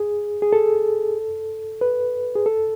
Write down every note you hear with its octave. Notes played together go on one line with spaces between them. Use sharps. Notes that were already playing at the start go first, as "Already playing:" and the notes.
Already playing: G#4
G#4
A4
B4
G#4
A4